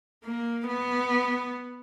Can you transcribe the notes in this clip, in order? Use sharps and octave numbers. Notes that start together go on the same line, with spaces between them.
A#3
B3